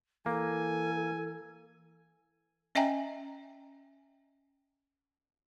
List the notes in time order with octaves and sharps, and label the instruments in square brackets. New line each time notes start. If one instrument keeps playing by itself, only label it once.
[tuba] E3 [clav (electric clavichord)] A#3 [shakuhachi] A4 [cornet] G#5
[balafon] C#4 D#5 E5 G5 G#5 A#5